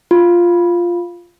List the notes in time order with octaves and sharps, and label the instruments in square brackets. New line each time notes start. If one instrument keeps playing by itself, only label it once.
[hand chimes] F4